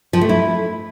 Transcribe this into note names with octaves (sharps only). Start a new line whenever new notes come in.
F3
A3
E4